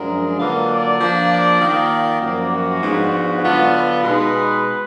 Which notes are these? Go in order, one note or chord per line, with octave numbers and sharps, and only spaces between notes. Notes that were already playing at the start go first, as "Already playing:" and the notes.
Already playing: F#2 F3 G#3 D4 A#4
D3 F#3 A#3 F4 B4
D5
F3 A#3 D4 F4
D5
D#3 A#3 F4
D5
F#2 F3 A#3
F#4
G#2 F3 B3 D4 F4
D3 F#3 B3 F4
B4
B2 G#3 D#4